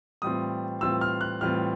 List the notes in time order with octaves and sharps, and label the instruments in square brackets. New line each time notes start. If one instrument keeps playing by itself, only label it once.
[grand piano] A2 E3 G3 C4 F4 D#6
A2 E3 G3 C4 F4 E6
F6
F#6
A2 E3 G3 C4 F4 F6